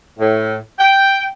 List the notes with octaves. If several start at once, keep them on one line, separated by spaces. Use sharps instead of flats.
A2
G5